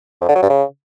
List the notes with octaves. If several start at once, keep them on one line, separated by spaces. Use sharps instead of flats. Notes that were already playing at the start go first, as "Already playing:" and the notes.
F2
D3
F#3
G2
C#3